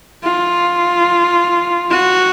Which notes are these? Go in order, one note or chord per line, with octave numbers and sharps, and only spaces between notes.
F4
F#4